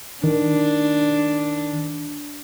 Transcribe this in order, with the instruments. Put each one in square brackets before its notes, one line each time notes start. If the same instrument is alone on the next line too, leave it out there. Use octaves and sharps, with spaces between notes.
[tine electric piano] D#3 [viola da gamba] D4